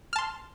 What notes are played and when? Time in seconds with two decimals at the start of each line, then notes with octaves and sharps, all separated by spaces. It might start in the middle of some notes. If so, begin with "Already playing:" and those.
0.13 F6
0.16 A5
0.18 C6